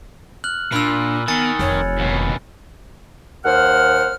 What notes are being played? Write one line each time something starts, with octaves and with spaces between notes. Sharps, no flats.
F6 F#6 F#7
A#2 D4 B5 E6
D#3 B3 G#5 A6 C#7
F1 C4 C#5
D#2 B2
D#2 C5 F#5 F6